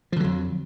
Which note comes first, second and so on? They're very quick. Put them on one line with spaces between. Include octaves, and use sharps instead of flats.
F3 D3 F#3 F2